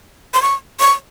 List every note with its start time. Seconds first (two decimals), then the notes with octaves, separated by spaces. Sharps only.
0.34 C6
0.42 C#6
0.80 C#6